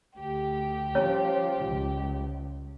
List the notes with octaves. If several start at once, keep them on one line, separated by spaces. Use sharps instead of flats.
D2 G4
F3 G3 C#4 C#5
C#2